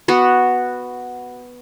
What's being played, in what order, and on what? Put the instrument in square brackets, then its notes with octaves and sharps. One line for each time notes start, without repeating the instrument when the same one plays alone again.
[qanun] B3 F#4